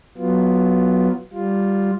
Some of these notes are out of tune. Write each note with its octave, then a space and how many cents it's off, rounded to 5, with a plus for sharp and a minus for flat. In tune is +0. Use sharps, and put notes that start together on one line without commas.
F#3 +5 B3 +0 F4 -5
G3 +0 F4 +0